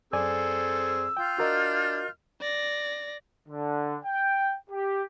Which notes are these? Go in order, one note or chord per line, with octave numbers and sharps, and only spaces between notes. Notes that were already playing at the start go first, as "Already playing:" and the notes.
F#2 C4 G#4 A4 D5 G#5 E6
F4 G5 F6 G6
D4 F#4 A#4 D#5
D5 A#6
D3
G5
G4